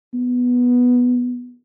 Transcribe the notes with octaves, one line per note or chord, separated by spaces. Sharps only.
B3